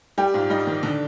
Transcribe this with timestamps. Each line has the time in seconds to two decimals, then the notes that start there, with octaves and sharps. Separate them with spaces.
0.18 G3 G4
0.34 G#2 F4
0.50 G3 D#4
0.67 D#3
0.83 D3 D4